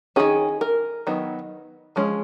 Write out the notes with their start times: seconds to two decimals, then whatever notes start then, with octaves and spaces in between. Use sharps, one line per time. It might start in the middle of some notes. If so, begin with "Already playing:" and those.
0.16 D#3 F#3 C#4 G#4
0.61 A#4
1.07 D#3 F#3 B3
1.96 F3 G#3 C#4